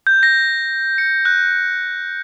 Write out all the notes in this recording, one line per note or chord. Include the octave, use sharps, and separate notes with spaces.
G6
A#6
C#7
F#6